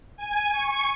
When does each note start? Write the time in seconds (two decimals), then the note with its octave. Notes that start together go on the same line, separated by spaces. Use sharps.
0.17 G#5
0.52 C#6